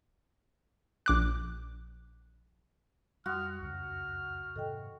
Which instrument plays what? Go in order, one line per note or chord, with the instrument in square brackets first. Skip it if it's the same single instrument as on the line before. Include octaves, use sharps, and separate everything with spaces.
[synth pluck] A#1 D6 F#6
[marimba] F2 C6 D#6 [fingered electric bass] G3 [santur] F#4 [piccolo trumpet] F6
[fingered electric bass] C#2 F#2 C#3 [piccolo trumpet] F6
[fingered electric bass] G#2 C3 D#3 [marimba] A4 D#5 G5